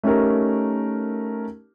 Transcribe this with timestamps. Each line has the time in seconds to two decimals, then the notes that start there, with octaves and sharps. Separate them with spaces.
0.03 A3 C#4 D#4 G4 A#4